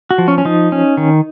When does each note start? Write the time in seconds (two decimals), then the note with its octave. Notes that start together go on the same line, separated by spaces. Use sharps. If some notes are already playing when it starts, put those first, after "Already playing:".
0.11 F#4
0.18 F3
0.28 C#4
0.38 C#4
0.45 F3 D#4
0.72 C#4
0.97 D#3